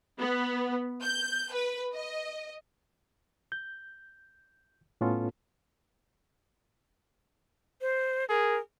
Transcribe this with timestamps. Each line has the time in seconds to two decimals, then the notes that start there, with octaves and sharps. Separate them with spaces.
0.18 B3
1.02 G6
1.51 B4
1.94 D#5
3.52 G6
5.01 A2 B3 C#4 F4 A4
7.81 C5
8.29 G#4 A#4